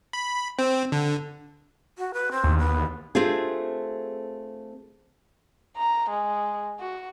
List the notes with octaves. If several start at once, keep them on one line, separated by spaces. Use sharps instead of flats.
B5
C4
D3
F#4
B4
C4
D#2
B3
A3 C4 D4 F4 G4 G#4
A#5
G#3
F#4